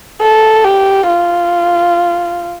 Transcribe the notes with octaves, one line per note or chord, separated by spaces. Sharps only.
A4
G4
F4